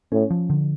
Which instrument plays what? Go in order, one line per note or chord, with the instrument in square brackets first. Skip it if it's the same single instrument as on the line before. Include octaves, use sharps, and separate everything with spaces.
[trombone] A2 [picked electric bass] C#4
[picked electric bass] F3
D3